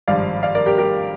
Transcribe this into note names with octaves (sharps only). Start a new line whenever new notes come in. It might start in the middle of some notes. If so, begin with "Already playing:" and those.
G#1 G2 F3 D5 F5
D5 F5
A#4 D5
G4 A#4
G4 A#4